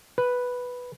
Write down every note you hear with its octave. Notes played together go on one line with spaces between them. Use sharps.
B4